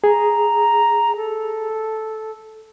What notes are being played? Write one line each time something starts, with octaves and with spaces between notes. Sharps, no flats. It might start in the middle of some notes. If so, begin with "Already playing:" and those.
G#4 A#5
A4